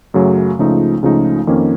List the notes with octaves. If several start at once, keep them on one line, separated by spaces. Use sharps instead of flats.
F#2 C#3 F#3 A3
C#2 C#3 F3 A3 D#4
C#2 C#3 F3 A3 D#4
F2 D#3 A#3 C#4